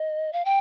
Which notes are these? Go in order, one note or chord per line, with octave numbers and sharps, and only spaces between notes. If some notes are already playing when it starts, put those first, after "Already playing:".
Already playing: D#5
F5
G5